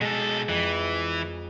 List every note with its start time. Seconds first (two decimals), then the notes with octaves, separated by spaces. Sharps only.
0.01 B2 G#3 A4 C7
0.48 F2 E3